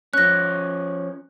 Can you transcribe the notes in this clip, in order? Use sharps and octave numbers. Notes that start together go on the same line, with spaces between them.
F3 C#4 F#6 A#6